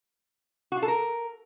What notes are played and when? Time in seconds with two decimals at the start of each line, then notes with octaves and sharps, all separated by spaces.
0.72 F#4
0.77 F4
0.82 A4
0.88 A#4